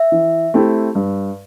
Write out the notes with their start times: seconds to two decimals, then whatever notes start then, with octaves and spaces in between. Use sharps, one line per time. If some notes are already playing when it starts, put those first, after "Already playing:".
Already playing: E5
0.12 E3
0.54 A3 C4 E4 G4
0.95 G2